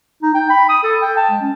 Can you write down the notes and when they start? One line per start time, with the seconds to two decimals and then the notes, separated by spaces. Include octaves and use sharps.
0.23 D#4
0.35 G5
0.50 B5
0.69 D#6
0.84 A4
1.02 G5
1.17 A5
1.30 G#3
1.42 C#4